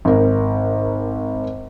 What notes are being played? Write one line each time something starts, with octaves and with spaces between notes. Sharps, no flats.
G#1 A#4